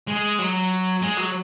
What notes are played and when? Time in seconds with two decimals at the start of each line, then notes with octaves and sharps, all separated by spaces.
0.07 G#3
0.38 F#3
1.02 G#3
1.17 F#3